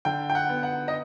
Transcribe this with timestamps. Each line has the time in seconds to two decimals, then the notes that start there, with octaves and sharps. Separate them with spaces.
0.05 D3 G5
0.30 G5
0.35 F#5
0.49 B3
0.63 F#5
0.88 D#5